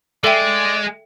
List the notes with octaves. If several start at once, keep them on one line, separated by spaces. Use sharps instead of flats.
G#3 A4 D5 E5 G5